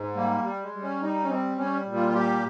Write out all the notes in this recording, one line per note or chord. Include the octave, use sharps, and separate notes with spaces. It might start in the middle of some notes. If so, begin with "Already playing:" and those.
Already playing: G#2
G3 A#3
G3
G#3
G3
C#4
G3 D#4
C#4
G3 C4
G3 C#4
A#2
F4
F4
G3 G4